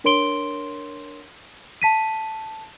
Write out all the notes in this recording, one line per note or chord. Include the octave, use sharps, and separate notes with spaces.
D4 A#4 C#5 C6 D7 G7
A5 B6 D#7